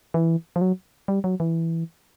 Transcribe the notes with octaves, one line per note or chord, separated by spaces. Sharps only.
E3
F3
F#3
G3
F#3
E3